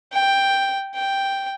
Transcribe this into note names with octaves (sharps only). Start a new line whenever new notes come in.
G5
G5